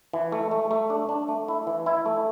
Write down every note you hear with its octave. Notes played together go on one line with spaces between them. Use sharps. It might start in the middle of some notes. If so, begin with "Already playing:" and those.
E3
A3
A3
A3
D4
D4
A3
E4
E3
E4
A3